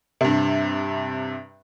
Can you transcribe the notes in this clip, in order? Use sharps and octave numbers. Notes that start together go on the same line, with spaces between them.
G2 C3